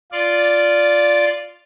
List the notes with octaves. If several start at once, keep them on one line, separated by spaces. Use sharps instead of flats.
F4 D5